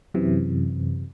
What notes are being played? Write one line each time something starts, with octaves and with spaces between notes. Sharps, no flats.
F#2 C3 E3